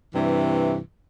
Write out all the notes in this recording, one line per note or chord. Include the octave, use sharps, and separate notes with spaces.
G2 C3 E3